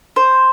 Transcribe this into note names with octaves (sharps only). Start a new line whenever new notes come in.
C5